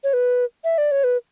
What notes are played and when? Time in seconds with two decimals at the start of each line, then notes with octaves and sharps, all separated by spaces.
0.04 C#5
0.13 B4
0.64 E5
0.78 D5
0.91 C#5
1.04 B4